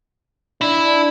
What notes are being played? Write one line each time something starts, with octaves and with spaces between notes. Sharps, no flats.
D4 E4